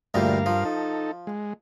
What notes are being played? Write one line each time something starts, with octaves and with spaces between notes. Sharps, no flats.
D2 G2 A#2 G3 A#4 F5
F3
D#4 A4
G#3